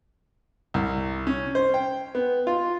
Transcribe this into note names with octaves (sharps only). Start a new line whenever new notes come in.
C2
C#4
C5
G5
B3
F4